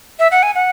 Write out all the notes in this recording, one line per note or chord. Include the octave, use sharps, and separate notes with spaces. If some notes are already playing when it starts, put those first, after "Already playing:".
E5
F#5
G#5
F#5